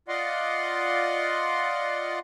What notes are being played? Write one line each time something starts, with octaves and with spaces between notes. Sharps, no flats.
F4 D5 D#5 F#5 C6